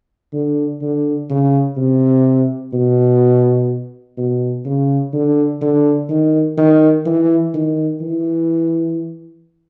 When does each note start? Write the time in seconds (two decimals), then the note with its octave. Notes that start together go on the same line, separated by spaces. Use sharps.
0.33 D3
0.82 D3
1.30 C#3
1.77 C3
2.73 B2
4.18 B2
4.65 C#3
5.13 D3
5.61 D3
6.09 D#3
6.57 D#3
7.06 E3
7.54 D#3
8.01 E3